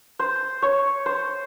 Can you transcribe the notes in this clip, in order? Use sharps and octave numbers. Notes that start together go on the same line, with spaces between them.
C5
C#5
C5